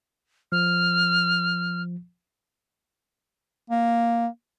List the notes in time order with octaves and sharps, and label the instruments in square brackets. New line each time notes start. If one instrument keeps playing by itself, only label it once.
[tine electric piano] F3 [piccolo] F6
[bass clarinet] A#3